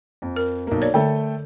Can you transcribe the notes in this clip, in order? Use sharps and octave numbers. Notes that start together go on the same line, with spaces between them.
F2
A#4
B1 A#3
C#5 D5
D3 A3 A4 G5